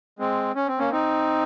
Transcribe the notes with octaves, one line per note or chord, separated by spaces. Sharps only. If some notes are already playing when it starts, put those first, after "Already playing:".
G#3 C4
C#4
C4
A#3 C#4
C4 D#4